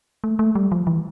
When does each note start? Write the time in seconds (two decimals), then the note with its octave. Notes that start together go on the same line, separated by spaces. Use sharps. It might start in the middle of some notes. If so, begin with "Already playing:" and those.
0.24 A3
0.39 A3
0.55 G3
0.72 F3
0.87 E3